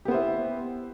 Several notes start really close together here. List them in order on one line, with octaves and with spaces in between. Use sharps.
G4 B3 C5 E4